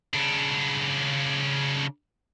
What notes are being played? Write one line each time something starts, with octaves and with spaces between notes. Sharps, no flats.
C#3 D4